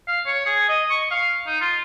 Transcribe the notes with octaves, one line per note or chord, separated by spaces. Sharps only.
F5
C#5
G#4
D#5
C#6
F5
D#4
F4